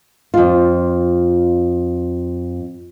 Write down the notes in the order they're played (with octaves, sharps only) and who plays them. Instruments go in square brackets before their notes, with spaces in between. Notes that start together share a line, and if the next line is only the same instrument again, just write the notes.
[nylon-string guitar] F2 F4